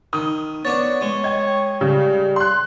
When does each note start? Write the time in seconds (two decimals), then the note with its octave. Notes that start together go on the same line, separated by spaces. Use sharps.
0.13 D#3 D#6
0.65 B3 D4 C#5 A6
1.01 G#3 C#5
1.24 D#5 G5 G#6
1.81 C#3 G3
2.36 C6 F#6